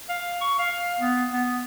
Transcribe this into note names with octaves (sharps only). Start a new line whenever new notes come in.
F5
C#6
F5
B3
B3